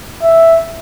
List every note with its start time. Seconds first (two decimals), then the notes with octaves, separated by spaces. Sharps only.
0.22 E5